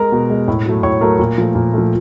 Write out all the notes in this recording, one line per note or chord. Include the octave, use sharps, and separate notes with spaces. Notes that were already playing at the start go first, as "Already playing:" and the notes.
Already playing: G#3 A#4 A#5
B2
G#3
A2
F#3 A3
A2 C#5 C#6
F#3 A3 A#4 A#5
A#2
F3 A3
A#2
F3 A3